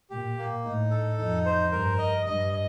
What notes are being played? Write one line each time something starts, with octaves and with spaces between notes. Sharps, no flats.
A#2 G4
A#3
A2 D#4
A4
F2 D#4
C5
G2 A#4
D#5
G2 D#5
D#5